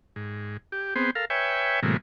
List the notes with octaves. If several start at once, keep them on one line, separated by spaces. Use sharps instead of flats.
G#2
G4
B3 C4 G#4 C5
A4 A#4 F5
B4 C#5 E5 G5 G#5
A2 C3 E3 F#3 G#3 A#3